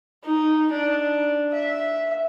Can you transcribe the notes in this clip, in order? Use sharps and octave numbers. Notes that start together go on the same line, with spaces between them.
D#4
D4
E5